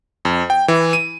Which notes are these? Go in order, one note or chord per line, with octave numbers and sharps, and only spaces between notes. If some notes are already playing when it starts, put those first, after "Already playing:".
F2
G5
E3
D#7